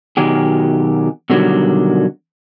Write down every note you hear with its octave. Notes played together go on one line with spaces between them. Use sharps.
B2 D#3 F#3 G4 G#4
B2 D3 D#3 F#3 G3